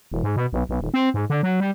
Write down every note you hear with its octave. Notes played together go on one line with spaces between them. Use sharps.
E1
G#2
B2
B1
B1
D#1
C4
G#2
D3
F#3
G3